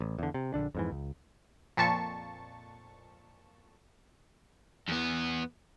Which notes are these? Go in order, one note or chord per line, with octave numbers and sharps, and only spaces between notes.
A1
E2 D3
C3
A#1 D#2 D3 D4
F2 G#2 E3
C#2
F2 A#2 A5 C#6
E2 B3